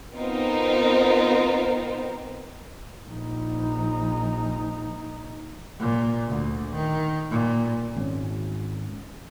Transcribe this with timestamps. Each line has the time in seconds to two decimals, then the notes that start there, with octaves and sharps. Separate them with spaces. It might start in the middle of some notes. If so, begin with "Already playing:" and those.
0.16 B3 C4 D#4 F4 A#4 C5
3.08 A#1 D#4
5.79 A#2
6.28 D2
6.75 D#3
7.31 A#2
7.96 G#1 C#4